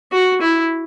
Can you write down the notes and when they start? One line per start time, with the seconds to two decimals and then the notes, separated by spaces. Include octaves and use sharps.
0.13 F#4
0.42 E4